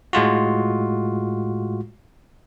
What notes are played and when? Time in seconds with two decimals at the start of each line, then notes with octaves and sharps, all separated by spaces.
0.13 A2 G#3 F4 F#4